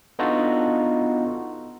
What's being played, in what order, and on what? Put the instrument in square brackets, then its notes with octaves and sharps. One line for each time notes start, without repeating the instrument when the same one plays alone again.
[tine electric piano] B3 D4 D#4 F4 F#4 A4